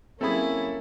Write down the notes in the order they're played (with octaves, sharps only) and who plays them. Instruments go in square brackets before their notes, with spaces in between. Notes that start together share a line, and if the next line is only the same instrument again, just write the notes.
[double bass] F#3 A#3 [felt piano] C4 G#4 [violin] C#4 E4 [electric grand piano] A4 B5